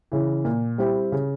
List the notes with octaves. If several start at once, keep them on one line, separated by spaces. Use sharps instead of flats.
C#3 E3
A#2
G3 C4 E4 G4
C#3